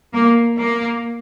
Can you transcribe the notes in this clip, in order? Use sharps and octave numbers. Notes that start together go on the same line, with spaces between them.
A#3
A#3